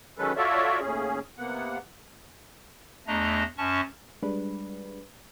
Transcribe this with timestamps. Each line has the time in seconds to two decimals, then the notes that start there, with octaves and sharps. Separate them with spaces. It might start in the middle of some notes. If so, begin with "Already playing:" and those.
0.18 D#3 F#3 G#3 C#4 A4 B4
0.36 F4 F#4 A4 C#5 D5 E5
0.80 D#2 A2 C#4 G#4
1.38 C3 A#3 B3 F#5
3.07 E2 A3 D4 D#5 A#5
3.58 F#2 C#4 A5 C#6
4.23 G3 G#3 D4 B4